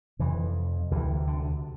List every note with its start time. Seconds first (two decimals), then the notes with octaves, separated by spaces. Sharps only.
0.19 F2 C3 E3
0.91 D2 C3 E3
1.27 D3